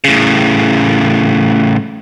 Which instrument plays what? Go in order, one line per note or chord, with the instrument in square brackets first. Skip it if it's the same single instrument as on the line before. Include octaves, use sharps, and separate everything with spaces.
[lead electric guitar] A2 C#3